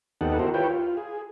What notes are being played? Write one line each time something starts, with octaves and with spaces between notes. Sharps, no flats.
D#2 B3 D#4 G4 A4 F#5
E4 F#4 G4 A#4 C5
E4 F4 G4 B4 C#5 G5
F4
G#4